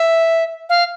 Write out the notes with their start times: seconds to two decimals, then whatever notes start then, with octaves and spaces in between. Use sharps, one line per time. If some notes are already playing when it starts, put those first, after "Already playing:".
Already playing: E5
0.69 F5